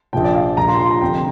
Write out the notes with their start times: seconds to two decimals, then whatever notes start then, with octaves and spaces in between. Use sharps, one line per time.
0.13 A#1 A#2 F3 G5
0.24 D5
0.35 F5
0.57 A#1 A#2 F3 A#5
0.68 C6
0.79 C6
0.90 A#5
1.01 F1 F2 D3 G5